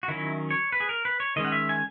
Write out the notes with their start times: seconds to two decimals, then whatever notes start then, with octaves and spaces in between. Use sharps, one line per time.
0.03 F#4
0.08 D#3 F#3 C#4 E4
0.51 C#5
0.72 B4
0.80 G#4
0.89 A#4
1.05 B4
1.20 C#5
1.36 D#3 G#3 C#4 D#5
1.45 F#5
1.52 E5
1.69 G#5